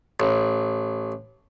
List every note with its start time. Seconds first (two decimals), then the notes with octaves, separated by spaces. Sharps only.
0.20 A1